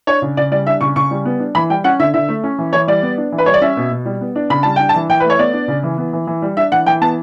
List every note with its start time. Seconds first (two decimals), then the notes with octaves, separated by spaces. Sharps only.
0.07 D4 C#5
0.22 C#3
0.37 C#3 D5
0.51 G3 D5
0.66 D4 E5
0.81 C#3 C#6
0.96 C#3 C#6
1.11 G3
1.25 B3
1.40 D4
1.55 E3 B5
1.70 G3 G5
1.84 C#4 F#5
1.99 D3 E5
2.14 D3 E5
2.29 A3
2.44 C#4
2.58 E3
2.73 E3 C#5
2.88 G3 D5
3.03 B3
3.18 D4
3.32 E3
3.38 B4
3.46 G3 C#5
3.54 D5
3.62 C#4 E5
3.77 B2
3.91 B2
4.05 G3
4.21 B3
4.36 D4
4.50 C#3 B5
4.63 G3 A5
4.76 D4 G5
4.89 A5
4.95 E3
5.09 E3 G5
5.20 A3 B4
5.30 C#5
5.39 B3 D5
5.53 D4
5.68 C#3
5.83 E3
5.98 B3
6.13 E3
6.27 E3
6.42 G3
6.57 D4 E5
6.72 E3 F#5
6.86 E3 G5
7.01 B3 A5